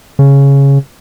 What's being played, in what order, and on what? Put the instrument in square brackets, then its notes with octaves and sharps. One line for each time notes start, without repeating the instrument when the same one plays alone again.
[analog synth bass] C#3